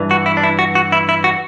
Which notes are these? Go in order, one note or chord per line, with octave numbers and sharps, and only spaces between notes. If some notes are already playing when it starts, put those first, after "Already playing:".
Already playing: G2 E3
F#4
E4
D4
E4
F#4
F#4
E4
E4
F#4